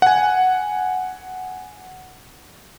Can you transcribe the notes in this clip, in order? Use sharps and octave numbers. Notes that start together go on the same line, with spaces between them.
F#5 G#5